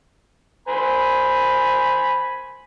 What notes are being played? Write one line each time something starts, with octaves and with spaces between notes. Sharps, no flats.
C5 G#5 B5